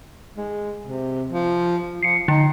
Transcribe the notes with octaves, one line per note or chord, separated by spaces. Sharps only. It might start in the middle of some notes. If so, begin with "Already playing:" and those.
G#3
C3
F3
F3 C7 C#7
D3 D#4